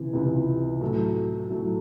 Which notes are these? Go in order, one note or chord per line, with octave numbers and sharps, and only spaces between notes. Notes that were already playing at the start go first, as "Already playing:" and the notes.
Already playing: C#2 C3 E3
C#2 C3 E3
A2 F#3 A3
A2 F#3 A3